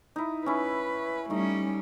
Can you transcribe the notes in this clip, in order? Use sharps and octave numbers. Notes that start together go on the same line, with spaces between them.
D#4 E4
C#4 E4 B4
G3 A3 C#4 D#4